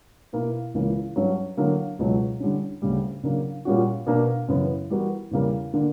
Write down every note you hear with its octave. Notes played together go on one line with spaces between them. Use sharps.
B2 A#3 E4
C#2 C#3 E3 A#3
G2 F#3 C#4
D3 F#3 A#3
C#2 B2 F#3
D3 G3 C#4
D2 C#3 G3
C#3 F#3 A#3 D4
A#2 G3 C#4 F#4
B2 A#3 D4
F#2 C#3 E3 B3
E3 G3 B3 F#4 A#4
E2 C#3 G3 A#3
D3 A#3 D4